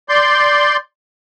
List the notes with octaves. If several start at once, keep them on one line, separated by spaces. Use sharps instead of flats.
D5 C6 G6